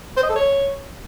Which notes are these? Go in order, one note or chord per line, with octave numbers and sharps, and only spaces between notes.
C5
D#5
A4
C#5